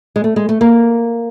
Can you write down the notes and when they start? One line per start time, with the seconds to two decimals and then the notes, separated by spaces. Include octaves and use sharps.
0.16 G#3
0.24 A3
0.36 G#3
0.49 A3
0.61 A#3